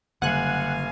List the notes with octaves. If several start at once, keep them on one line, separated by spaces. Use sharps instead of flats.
F#1 D3 G3 F5 F#5 G#5 F#6